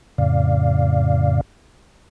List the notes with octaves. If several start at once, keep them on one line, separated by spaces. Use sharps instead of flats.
F2 A2 C#3 D5 F5